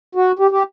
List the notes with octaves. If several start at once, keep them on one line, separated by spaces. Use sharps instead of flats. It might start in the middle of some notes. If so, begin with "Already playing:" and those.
F#4
G4
G4